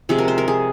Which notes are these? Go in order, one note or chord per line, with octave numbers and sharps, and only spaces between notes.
C3 F3 G#3 G#4
A#4
C5
A#4
G#4